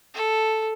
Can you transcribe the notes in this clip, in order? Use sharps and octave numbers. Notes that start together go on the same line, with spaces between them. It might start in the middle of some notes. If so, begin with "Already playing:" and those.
A4